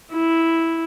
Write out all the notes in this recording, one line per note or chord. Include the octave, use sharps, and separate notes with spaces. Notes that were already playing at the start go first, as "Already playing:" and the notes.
E4